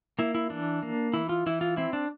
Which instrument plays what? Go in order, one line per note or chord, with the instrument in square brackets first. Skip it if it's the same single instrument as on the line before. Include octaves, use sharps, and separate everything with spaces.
[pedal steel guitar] A#3 E4
E4
E3 D4
A#3
E3 E4
F4
E3 E4
F4
C4 E4
D4